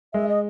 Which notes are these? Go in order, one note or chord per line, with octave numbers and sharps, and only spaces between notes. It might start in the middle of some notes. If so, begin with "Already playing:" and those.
G#3 E5
D#5